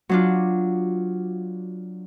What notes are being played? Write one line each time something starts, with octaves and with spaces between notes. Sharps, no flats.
F#3 D4 F4